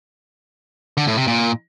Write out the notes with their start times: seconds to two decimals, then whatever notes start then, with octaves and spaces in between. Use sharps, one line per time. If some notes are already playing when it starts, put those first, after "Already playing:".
0.97 D3
1.07 A2
1.17 C3
1.27 A#2